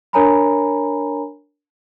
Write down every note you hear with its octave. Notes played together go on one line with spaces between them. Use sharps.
D4 A#4 C#5 G#5 A#5 B5